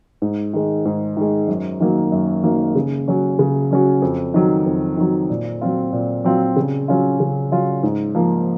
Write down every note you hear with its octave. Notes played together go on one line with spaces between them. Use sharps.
G#2
D#3 G#3
G#2
D#3 G#3
F#2
D#3 F#3 A#3
F#2
D#3 F#3 A#3
C#3
F#3 C#4 F#4
C#3
F#3 C#4 F#4
F2
D#3 F#3
F2
D#3 F#3
A#2
F#3 C4 F4
A#2
F#3 C4 F4
C#3
F#3 C#4 F4
C#3
F#3 C#4 F4
G#2
F3 A#3 F4